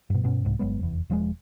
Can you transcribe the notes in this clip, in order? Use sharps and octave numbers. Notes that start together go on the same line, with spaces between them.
G2 B2
G2 B2 B3 C#4
C2 G#2
G1 F#3 G#3 B3
F1 E2
E1 F3 G3 G#3